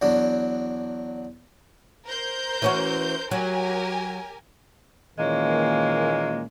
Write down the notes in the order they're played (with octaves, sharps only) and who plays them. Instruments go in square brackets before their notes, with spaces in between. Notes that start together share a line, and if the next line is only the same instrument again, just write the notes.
[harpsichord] E2 F#3 D4
[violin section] A#4 C5 G6
[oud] E3 C#4 F#4
[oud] F#3 [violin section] G4 A#4 G#5
[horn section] A#2 D#3 E3 G#3 A#3 C#4